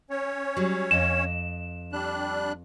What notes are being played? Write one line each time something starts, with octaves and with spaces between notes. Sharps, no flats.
C#4 C#5
F#3 G3
F2 D#5 E7
G3 D4 F#6